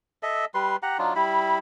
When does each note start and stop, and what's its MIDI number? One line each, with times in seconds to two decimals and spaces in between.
0.23 0.45 69
0.23 0.45 75
0.23 0.45 76
0.54 0.76 55
0.54 0.76 71
0.54 0.76 84
0.83 0.97 67
0.83 0.97 78
0.83 0.97 82
0.99 1.14 54
0.99 1.14 62
0.99 1.14 63
0.99 1.14 65
1.16 1.58 55
1.16 1.58 64
1.16 1.58 83